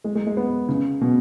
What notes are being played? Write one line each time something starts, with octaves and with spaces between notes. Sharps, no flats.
G#3
G#3
G#3
B3
C#3
B2